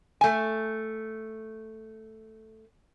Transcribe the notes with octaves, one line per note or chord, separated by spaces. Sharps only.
A3 G#5